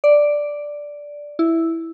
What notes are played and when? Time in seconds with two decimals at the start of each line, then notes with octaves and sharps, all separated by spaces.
0.04 D5
1.39 E4